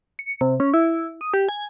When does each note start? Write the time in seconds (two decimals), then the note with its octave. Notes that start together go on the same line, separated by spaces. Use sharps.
0.19 C#7
0.41 C3
0.60 C#4
0.74 E4
1.21 D#6
1.34 G4
1.49 G#5